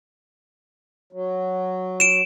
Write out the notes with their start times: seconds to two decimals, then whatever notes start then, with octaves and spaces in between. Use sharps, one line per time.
1.12 F#3
2.00 D7 E7